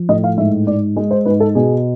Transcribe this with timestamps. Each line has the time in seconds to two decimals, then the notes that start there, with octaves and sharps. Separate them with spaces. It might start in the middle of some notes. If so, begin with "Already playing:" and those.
Already playing: F3
0.09 A2 D#5
0.24 F5
0.37 G#2 E5
0.67 G#2 D5
0.96 G#3
1.11 C5
1.26 G#2 B4
1.40 A4
1.55 B2 G#4